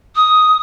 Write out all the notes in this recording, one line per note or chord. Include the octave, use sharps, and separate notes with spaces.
D#6